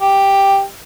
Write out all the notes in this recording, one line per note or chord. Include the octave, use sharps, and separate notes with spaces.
G4